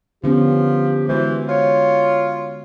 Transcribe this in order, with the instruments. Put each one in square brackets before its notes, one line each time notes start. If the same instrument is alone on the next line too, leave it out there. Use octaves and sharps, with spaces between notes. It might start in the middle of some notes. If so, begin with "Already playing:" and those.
[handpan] D3 B3 C#4 [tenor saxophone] F3 [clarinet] G4
[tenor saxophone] E3 [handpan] G#3 F#4 [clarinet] C5
[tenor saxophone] F4 [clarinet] C#5